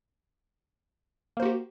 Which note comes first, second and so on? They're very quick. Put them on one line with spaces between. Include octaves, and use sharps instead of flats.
A#3 C5 F#4 G4